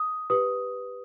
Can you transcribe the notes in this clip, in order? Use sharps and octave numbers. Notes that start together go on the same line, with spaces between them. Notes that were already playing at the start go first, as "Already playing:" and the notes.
Already playing: D#6
G4 B4 D#6